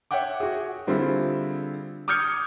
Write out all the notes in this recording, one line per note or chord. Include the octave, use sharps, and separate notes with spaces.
C#5 E5 F#5 G5 D6
F#4 G#4
D3 G3 C4 E4 F4 G#4
D6 D#6 F6 G6 G#6 C#7